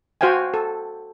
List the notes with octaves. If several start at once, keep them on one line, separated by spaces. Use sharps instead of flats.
F#4 C5 F5 G5 G#5
A4